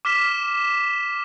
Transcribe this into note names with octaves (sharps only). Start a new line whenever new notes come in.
D6 F6 B6 E7